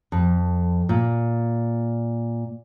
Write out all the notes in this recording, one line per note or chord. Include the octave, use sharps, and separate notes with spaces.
F2
A#2